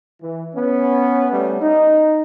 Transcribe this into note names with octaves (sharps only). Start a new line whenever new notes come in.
E3
B3 C#4
G3 A3 B3 C#4
D#4